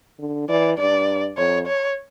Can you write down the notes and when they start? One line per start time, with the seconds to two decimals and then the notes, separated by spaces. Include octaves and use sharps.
0.19 D3
0.49 E3 D5
0.78 G2 D5
1.37 F2 C#5
1.67 C#5